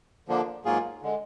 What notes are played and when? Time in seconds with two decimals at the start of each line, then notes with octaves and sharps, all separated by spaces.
0.28 D3 F3 A#3 D4
0.65 G#2 F#3 A#3 F4 G#4
1.03 D3 G#3